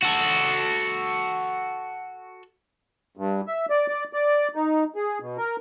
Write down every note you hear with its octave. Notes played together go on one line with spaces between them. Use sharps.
F#4 A4
G2
E5
D5
D5
D5
D#4
G#4
B2
A#4